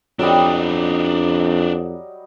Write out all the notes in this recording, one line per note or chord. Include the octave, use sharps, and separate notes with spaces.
F2 F#3 G3 D4 D#4 D#5